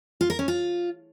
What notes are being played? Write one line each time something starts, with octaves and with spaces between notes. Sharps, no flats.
F4
A#4
C#4
F4